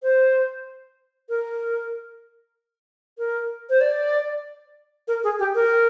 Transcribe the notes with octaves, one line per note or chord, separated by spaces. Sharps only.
C5
A#4
A#4
C5
D5
A#4
G#4
G4
A#4